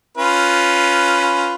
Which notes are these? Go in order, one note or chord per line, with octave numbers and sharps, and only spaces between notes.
C#4 F4 B4